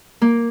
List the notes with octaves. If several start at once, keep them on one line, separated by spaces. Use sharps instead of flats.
A#3